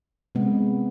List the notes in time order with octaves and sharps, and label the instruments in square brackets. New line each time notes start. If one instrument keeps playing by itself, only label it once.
[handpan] C3 G#3 B3